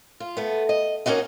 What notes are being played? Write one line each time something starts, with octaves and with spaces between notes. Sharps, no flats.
F4
A3 B3
D#5
A#3 C#4 D#4 F#4 D#5